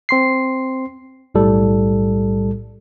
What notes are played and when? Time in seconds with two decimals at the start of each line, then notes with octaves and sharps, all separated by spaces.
0.09 C4 C6 C7
1.35 B1 A2 G3 A4